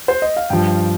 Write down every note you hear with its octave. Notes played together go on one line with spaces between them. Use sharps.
C5
D#5
F5
G2 F3 G5